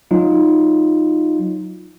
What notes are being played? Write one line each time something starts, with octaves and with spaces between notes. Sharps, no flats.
F#3 D#4 F4